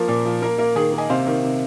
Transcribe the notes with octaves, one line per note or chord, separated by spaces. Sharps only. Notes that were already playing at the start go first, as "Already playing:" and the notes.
Already playing: F3 A#3 A#4
A#2
F3
A#3 A#4
A#3 A#4
D#3 G#4
A#3
D#5 G#5
C3 C5 F5
D#3
C3